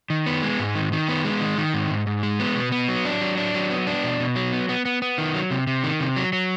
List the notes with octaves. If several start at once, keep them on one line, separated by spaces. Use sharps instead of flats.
D#3
B3
G#3
G#2
D#3
D#3
B3
G#3
D#3
D#3
G#2
G#2
G#2
G#3
B3
B2
B3
F#3
D4
F#3
D4
F#3
B3
D4
B2
B2
F#3
B3
B3
B3
B3
D#3
F#3
C3
C3
D#3
C3
F#3
F#3